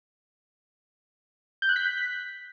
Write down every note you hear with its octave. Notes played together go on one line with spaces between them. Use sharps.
G6
F#6
B6